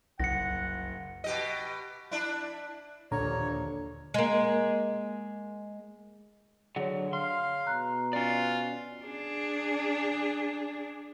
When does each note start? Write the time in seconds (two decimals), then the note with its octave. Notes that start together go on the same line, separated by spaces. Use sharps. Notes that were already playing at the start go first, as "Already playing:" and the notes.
0.20 F#1 C2 F#5 A#6 C#7
1.24 B2 G4 D#5
2.11 D4 E4
3.12 A#1 D#2 A#2 D3 C#5 A#5
4.14 G#3 A#3
6.76 D3 F#3 G#4 C#5
7.13 F5 C6
7.67 B2 A#5 F#6
8.13 C#4 F4 D5
9.05 D4 G#4